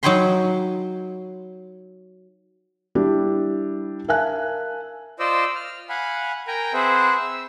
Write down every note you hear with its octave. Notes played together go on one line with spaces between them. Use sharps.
F#3 D#4 C#5 G5 B5 C6
G3 D4 E4 G4
A#4 E5 F5 G#5 A5 F#6
F4 C5 D5 D#5 E6
F6
F5 F#5 G#5 B5
A#4 G5 G#5 A#5
C4 G#4 B4 C5 E5 F#5
E6